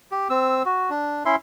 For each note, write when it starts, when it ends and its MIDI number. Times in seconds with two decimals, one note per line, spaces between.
0.11 0.28 67
0.30 0.63 60
0.30 0.63 88
0.66 0.90 66
0.90 1.23 62
1.26 1.36 61
1.26 1.36 64
1.26 1.36 76
1.26 1.36 84